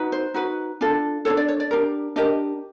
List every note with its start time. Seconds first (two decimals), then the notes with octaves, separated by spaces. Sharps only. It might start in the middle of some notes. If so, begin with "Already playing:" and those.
Already playing: D#4 F#4 B4
0.12 C5
0.34 D#4 F#4 B4
0.81 D4 F4 A4
1.25 D4 F4 A4 C#5
1.37 D5
1.49 C#5
1.60 D5
1.71 D4 G4 A#4
2.16 D4 G4 A#4 D#5